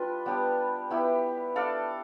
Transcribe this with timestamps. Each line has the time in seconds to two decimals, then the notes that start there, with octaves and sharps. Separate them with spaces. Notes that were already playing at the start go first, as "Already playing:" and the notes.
Already playing: G3 D4 F4 B4
0.26 G3 B3 D4 G4
0.90 B3 E4 G4
1.56 D4 A4 D5 F5